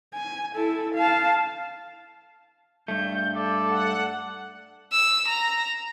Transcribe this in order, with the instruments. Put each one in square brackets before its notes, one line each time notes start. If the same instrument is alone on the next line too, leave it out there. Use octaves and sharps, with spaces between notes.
[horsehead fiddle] G#5
E4 A4
F5 A5
[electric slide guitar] G2 A3 [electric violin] G6
[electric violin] A4 [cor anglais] D5
[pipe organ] F#5
[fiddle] E6
A#5